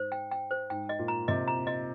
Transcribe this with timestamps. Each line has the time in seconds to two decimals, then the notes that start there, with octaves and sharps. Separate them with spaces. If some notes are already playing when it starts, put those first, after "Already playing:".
Already playing: G#2 C5
0.12 G5
0.32 G5
0.51 C5
0.70 G#2 G5
0.89 D#5
0.99 A#2
1.08 A#5
1.28 C3 D#5
1.48 A#5
1.67 D#5